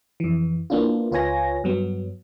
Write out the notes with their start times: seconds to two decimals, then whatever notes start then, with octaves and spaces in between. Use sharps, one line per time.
0.20 F2 E3
0.70 A#3 B3 D4 E4 F4
1.11 C#2 F4 B4 C#5 G#5 A#6
1.64 G2 F#3 B3